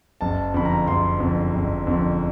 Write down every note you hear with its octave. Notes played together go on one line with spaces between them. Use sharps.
F#1 A5
F2 D3 B5
A#5
F#1 C6
F2 D3
F#1
F2 D3